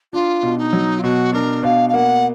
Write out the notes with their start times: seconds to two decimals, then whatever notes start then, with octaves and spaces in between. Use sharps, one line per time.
0.13 D4 F4
0.43 B2
0.58 D#4
0.73 F#3
0.99 F4
1.03 B2 F#4
1.33 D4 A#4
1.63 B2 F5
1.89 F5
1.94 A#3 F#5